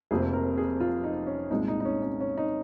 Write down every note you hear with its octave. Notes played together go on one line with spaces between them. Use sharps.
F1 F2 C3 F3 A#3 G#4
A#4
G#4
F4
D#4
C#4
C2 A#2 G#3 D#4
D#4
D#4
C#4
C#4
C#4
D#4